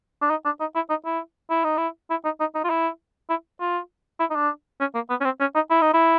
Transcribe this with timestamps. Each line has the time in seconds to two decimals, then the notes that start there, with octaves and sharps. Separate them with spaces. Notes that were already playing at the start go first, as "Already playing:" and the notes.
0.22 D4
0.30 D#4
0.45 D4
0.60 D#4
0.75 E4
0.90 D#4
1.05 E4
1.50 E4
1.64 D#4
1.78 E4
2.10 E4
2.25 D#4
2.40 D#4
2.55 D#4
2.64 F4
2.70 E4
3.30 E4
3.60 F4
4.20 E4
4.30 D#4
4.36 D4
4.80 C#4
4.95 A#3
5.10 B3
5.20 C#4
5.24 C4
5.40 C#4
5.55 D#4
5.70 E4
5.82 D#4
5.94 E4